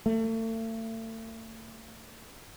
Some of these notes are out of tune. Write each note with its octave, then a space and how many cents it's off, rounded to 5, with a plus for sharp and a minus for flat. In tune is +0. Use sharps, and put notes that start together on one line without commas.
A3 +40